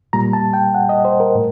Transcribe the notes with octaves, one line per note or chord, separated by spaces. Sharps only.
A#2 G3 A#5
A5
G5
F#5
D#5
C5
A#4
A2